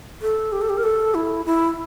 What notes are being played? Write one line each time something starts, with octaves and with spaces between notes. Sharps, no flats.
A4
G4
A4
G4
A#4
A4
E4
E4